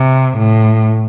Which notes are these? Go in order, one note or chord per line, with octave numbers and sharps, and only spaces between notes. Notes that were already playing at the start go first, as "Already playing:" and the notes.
Already playing: C3
A2